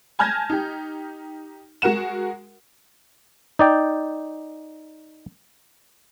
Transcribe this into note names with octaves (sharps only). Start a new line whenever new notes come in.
G#5 A5 F6 G6 G#6 A#6
D#4 G4
G#3 F#4 A#4 F#5 E7
D#4 D5 G5